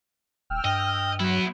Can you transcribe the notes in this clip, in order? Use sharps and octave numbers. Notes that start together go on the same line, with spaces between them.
D#1 G5 E6 F6
G2 D#5
F#3 B3 E4